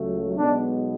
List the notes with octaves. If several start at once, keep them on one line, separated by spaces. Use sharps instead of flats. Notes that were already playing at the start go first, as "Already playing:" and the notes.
Already playing: C#2 C#3 F#3 A3
B1 B2 G#3 B3 D4